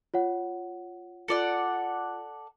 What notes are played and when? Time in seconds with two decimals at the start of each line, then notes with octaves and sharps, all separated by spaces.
0.14 F4 C#5 F#5
1.28 F4 A4 D5 F#5 C#7